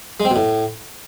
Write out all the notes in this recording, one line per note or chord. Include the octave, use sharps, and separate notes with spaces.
G#3
C4
B2
A2